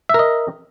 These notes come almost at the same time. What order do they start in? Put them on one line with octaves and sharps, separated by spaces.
E5 A#4 D#5